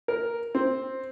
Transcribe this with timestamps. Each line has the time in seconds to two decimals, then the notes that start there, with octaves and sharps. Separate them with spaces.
0.08 A#4
0.55 C4